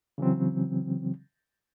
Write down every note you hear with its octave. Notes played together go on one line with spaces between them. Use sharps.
C#3 E3 F#3 C4